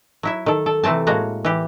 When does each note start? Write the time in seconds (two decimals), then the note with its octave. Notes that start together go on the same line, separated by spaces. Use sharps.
0.23 F#3 E4 E5
0.46 D#3 A4
0.66 A4
0.84 C3 E3 A3 C4 A5
1.07 A2 G#3 A#3 F#4 A#5
1.45 E3 G4